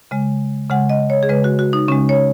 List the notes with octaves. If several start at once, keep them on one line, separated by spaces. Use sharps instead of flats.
C#3 G#3
C#3 G#3 F#5
D#5
C#5
G#4
C#3 G#3 B4
F#4
F#4
D#4
C#3 G#3 C#4
C#5